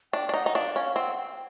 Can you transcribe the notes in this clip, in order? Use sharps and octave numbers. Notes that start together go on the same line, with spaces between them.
D4 G5
D4
D#4 F#5
D#4
D4 F5
C#4 F5
C4 F#5
G5